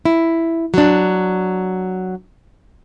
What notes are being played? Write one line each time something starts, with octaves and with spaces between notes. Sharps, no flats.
E4
F#3 D4